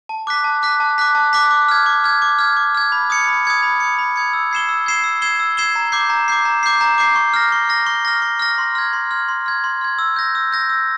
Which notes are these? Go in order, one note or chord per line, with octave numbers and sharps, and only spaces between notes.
A5
D6 F#6 B6
A5
D6 F#6 B6
A5
D6 F#6 B6
A5
D6 F#6 B6
D6
F6 G#6
D6
F6 G#6
D6
F6 G#6
D6
F6 G#6
B5
D#6 G#6 C#7
B5
D#6 G#6 C#7
B5
D#6 G#6 C#7
B5
D#6 G#6 C#7
E6
G#6 C7 E7 G7
E6
G#6 C7 E7 G7
E6
G#6 C7 E7 G7
E6
G#6 C7 E7 G7
A#5
D6 G6 C7
A#5
D6 G6 C7
A#5
D6 G6 C7
A#5
D6 G6 C7
C#6
F6 A#6
C#6
F6 A#6
C#6
F6 A#6
C#6
F6 A#6
C6
F6 G#6
C6
F6 G#6
C6
F6 G#6
C6
F6 G#6
E6
G6 A#6
E6
G6 A#6
E6